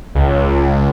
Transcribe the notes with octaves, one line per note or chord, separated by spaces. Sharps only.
C#2